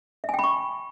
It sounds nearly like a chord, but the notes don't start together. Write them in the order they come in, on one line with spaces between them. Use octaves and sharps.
E5 G#5 G5 B5 C#6